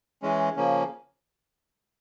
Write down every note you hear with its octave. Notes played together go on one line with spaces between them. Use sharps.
E3 G#3 C#4
C#3 F3 A#3 C#4